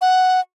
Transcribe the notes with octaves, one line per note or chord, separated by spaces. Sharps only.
F#5